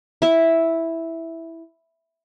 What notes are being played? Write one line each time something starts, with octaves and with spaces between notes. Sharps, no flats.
E4 E5